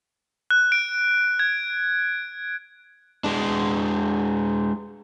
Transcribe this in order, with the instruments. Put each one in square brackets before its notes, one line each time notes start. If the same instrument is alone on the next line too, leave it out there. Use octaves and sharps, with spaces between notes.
[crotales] F#6
D7
G#6
[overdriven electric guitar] G#3 D4